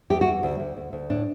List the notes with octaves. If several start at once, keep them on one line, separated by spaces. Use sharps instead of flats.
E2 G4
F#4
E2
D2
D2
D2
D2
A2 D4